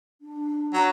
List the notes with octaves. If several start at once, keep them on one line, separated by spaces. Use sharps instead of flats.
D4
F#3